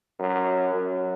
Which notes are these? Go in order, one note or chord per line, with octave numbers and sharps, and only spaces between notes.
F#2
F#2